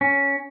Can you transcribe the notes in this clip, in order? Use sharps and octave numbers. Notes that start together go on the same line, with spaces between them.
C#4